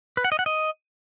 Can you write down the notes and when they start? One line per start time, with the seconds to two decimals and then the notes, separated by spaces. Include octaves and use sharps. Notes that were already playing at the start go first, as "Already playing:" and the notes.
0.17 B4
0.24 F#5
0.32 D#5
0.39 F#5
0.46 D#5